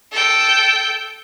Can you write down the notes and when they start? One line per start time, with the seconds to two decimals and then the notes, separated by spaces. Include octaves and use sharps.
0.13 A4 G5